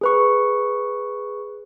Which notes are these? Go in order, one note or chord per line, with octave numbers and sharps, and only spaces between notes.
G#4 B4 C#6